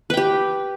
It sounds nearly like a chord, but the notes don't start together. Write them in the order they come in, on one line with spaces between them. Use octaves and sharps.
B4 G5 G4